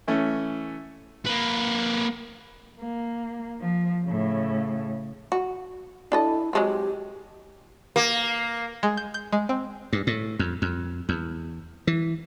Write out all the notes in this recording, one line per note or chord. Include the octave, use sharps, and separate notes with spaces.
E3 A3 C#4
A#3 B4
A#3
F3
A2 C#3
F#4
D4 E4 A4 D#5
F#3 G#3 C4 G4
A#3
G#3
G6
G6
G#3
C4
G2
A2
F2
F2
E2
E3